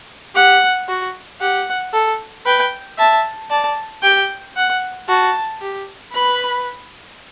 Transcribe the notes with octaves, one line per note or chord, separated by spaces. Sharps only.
G4 F#5
F#4
G4 F#5
A4
B4 G5
E5 A5
D5 A5
G4 G5
F#5
F#4 A5
G4
B4 B5